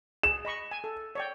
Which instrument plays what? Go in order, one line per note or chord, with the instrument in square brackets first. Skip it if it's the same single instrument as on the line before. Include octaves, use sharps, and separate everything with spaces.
[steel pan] G#4 [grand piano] E7
[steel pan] D#5 B5 C#6
G#5
A4
C#5 D5 G5